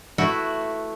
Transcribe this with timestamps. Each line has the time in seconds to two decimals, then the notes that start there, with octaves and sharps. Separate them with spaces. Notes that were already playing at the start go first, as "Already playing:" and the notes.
0.18 A3 E4 F#4 B4